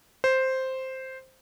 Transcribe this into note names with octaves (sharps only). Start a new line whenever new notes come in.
C5